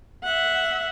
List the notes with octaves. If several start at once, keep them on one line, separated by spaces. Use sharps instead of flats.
E5 F#5